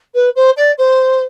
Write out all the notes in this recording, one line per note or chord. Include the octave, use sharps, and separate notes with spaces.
B4
C5
D5
C5